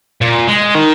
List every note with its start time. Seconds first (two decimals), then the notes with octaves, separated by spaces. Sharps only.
0.21 A#2
0.48 G#3
0.75 D#3